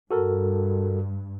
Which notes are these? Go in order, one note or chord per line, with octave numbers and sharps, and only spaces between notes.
G2 F#4 A4 A#4